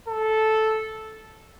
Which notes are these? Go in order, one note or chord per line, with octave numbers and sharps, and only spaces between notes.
A4